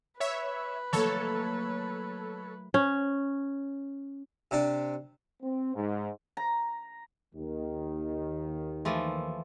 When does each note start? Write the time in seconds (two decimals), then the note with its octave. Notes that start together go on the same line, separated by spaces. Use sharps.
0.20 B4 C#5 E5
0.93 F#3 A3 A#3 A4 C#5
2.74 C#4
4.51 C3 D4
5.42 C4
5.74 G#2
6.37 A#5
7.35 D#2 D#3
8.85 E3 F3 A3